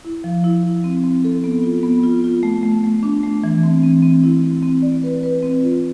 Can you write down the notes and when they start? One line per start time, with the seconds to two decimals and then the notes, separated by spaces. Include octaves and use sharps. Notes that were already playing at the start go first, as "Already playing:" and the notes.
0.05 E4
0.24 F3
0.44 E4
0.63 E4
0.84 C4
1.04 C4
1.24 A4
1.44 B3
1.64 F4
1.83 B3
2.03 F4
2.24 F4
2.43 A3
2.63 A3
2.84 A3
3.03 D4
3.23 A3
3.44 E3
3.63 C4
3.83 C4
4.02 C4
4.24 E4
4.44 E4
4.63 C4
4.82 D5
5.03 B4
5.23 B4
5.43 C4
5.62 F4